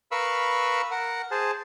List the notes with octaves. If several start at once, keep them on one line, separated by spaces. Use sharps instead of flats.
A#4 B4 F5 B5 C#6 E6
A#4 F#5
G#4 C5 A5